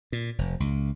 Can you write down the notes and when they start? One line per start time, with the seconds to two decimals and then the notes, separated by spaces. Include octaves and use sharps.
0.12 A#2
0.38 F1
0.60 C#2